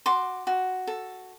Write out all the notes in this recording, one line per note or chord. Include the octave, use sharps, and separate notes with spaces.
F#4 C6 D6
F#4
A4